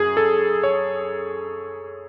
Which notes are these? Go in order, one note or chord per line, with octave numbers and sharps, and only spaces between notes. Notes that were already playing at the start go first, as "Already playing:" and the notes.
Already playing: F#2 G#4
A4
C#5